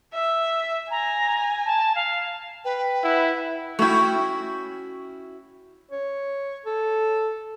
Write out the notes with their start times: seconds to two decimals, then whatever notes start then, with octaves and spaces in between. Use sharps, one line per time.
0.14 E5
0.90 G#5 A#5
1.65 A5
1.95 F5
2.65 B4 G5
3.03 E4 F#5
3.79 A3 C#4 E4 F#4 G5
5.91 C#5
6.66 A4